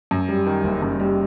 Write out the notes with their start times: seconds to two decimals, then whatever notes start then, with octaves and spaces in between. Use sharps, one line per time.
0.11 F#2
0.29 G3
0.46 D#3
0.64 F#1
0.82 F#2
1.00 G3